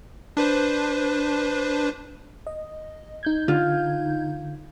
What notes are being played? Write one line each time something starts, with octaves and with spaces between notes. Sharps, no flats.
D4 B4 C5
D#5
D#4 G6 G#6
D3 F4